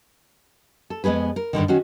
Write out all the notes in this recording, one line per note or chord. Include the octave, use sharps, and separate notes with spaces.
A4
F2 G#3 B3 G#4 B4
A#4
G2 B2 D3 D#3
D#3 C#4 F#4 G#4